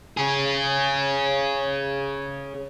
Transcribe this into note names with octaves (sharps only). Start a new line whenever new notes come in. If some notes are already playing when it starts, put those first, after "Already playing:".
C#4 G#4